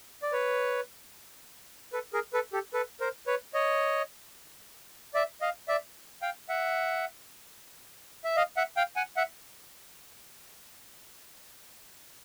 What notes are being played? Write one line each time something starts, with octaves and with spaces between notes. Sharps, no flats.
D5
B4 C#5
A4 B4
G#4 A#4
A4 B4
G4 A4
A4 B4
A#4 C5
B4 C#5
C#5 D#5
D5 E5
D#5 F5
D5 E5
F5 G5
E5 F#5
E5
D#5 F5
E5 F#5
F5 G5
F#5 G#5
E5 F#5